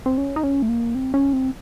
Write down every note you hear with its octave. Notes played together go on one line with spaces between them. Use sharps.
C4
C#4
D#4
C#4
A3
A#3
C4
C#4
C4